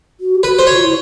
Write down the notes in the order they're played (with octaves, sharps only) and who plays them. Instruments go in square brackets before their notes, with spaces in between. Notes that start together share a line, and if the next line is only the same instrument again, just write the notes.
[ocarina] F#4
G4
[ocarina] F#4 [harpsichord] B4
[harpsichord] C5
[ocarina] F#4 [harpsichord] C#5
[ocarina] F4
E4